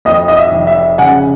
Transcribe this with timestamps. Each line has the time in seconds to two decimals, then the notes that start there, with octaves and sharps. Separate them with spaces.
0.05 F2 D#5
0.28 D#5
0.37 E5
0.52 F1
0.67 E5
0.98 C#3 F#5 G#5